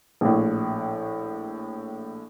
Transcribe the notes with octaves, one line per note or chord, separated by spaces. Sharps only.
A#1 A2